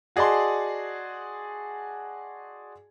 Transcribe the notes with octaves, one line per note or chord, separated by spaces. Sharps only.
F#4 G#4 D5 D#5 A5 C6